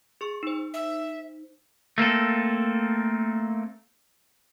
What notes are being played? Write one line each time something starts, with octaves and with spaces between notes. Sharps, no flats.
G#4 C#6
D#4 C5
E5
A3 A#3 C4 A4